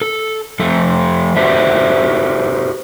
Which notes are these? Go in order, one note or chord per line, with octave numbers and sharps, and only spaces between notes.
A4
F3 A3 A4
F#4 G4 A4 B4 C5 E5